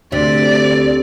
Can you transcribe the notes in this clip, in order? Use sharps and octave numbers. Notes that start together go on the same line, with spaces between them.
D2 C3 D5